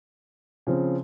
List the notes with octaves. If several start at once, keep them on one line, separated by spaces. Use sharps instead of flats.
C#3 F3 C4